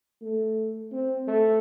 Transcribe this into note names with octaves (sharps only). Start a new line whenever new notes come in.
A3
C4
A3